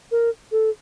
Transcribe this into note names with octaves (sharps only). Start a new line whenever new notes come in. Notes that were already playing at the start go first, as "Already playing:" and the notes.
A#4
A4